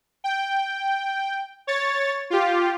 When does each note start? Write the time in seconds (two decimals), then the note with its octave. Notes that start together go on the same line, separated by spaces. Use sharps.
0.24 G5
1.67 C#5 A6
2.30 F4 G4